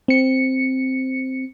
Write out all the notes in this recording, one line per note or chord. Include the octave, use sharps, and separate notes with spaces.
C4 C#7